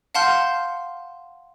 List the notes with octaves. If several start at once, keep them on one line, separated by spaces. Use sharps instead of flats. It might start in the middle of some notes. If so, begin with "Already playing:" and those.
F5 F#5 A5 C6 F6 G6